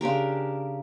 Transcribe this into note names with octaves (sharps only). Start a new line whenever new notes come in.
C#3 D4 G4 A#4